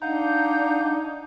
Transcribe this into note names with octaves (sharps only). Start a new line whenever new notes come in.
D4 D#4 F5 F#5 A#5 G6